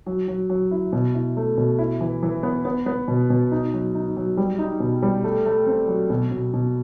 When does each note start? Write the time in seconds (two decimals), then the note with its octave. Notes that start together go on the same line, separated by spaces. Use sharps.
0.06 F#3
0.28 F#3
0.50 F#3
0.71 E4
0.93 B2
1.14 E4
1.37 A3
1.58 B2
1.79 E4
2.01 E3
2.23 E3
2.43 B3
2.65 B3
2.86 B3
3.08 B2
3.30 B2
3.52 D#4
3.74 F#3
3.95 D#4
4.17 F#3
4.37 G3
4.59 D#4
4.80 B2
5.03 G3
5.24 A3
5.46 A3
5.66 C4
5.88 F#3
6.10 B2
6.32 B2
6.54 B2